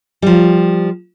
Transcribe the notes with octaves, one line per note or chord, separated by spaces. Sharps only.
F3 G3